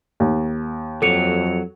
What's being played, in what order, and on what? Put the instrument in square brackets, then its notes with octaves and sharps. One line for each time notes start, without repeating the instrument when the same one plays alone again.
[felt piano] D#2
[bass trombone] F2 [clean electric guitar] F#3 [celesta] A4 C#7 F7